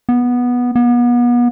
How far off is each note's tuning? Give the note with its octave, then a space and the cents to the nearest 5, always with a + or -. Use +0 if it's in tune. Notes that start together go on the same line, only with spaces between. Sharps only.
B3 -10
B3 -35